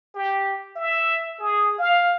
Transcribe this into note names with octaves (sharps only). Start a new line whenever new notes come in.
G4
E5
G#4
F5